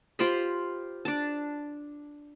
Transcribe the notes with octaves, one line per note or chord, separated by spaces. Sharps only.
F4 G4 C5 B5
D4 A5